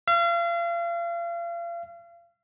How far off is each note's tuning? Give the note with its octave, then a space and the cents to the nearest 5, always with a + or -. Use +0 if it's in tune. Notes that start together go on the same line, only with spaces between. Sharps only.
F5 -35